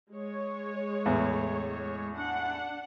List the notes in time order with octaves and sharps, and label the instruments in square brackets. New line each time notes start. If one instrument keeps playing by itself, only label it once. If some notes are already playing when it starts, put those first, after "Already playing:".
[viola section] G#3 C#5
[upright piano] E2 A2
[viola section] D4 F#5